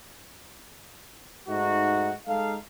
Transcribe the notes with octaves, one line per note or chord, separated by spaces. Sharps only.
G#2 A3 D#4 F#4
G#3 D#4 A4 F5